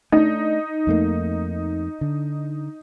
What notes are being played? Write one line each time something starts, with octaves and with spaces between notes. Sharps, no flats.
A3 D4 D#4
F2 A3 A#3
D3